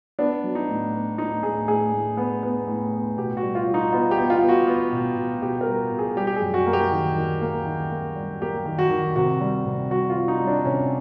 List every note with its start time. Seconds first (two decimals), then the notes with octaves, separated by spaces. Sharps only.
0.19 B3 D4
0.44 F#3
0.55 D#4
0.69 A2
0.93 B3
1.18 A2 D#4
1.43 A2 G#4
1.68 A2 G#4
1.93 A2
2.17 B3
2.43 B3
2.67 A2
2.93 B3
3.18 B2 G4
3.37 F#4
3.42 G3
3.55 F4
3.67 G3
3.74 D#4
3.92 B3 F4
4.11 G4
4.18 B3
4.30 F4
4.42 B3
4.49 F#4
4.67 B3
4.92 B2
5.17 B2
5.42 B2 G4
5.61 A#4
5.67 G3
5.92 B2
5.99 G#4
6.16 G3 G4
6.27 G4
6.36 G#4
6.42 F#2
6.54 F#4
6.66 A#3
6.73 G4
6.92 D#3
7.17 D#3
7.41 A#3
7.66 D#3
7.91 A#3
8.16 G3
8.41 A#3 G4
8.66 D#3
8.79 F#4
8.90 D#3
9.16 C3 F#4
9.41 G3
9.66 C3
9.91 G3 F#4
10.10 F4
10.16 C3
10.28 D#4
10.41 G3
10.47 D4
10.65 C3 C#4